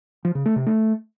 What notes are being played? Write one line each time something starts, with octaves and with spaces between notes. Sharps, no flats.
F3
C#3
A3
C3
A3